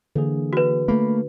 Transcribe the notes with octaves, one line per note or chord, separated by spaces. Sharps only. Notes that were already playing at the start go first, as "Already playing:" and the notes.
D3 E3 A#3 G#4
F#4 B4
A3 A#3 B5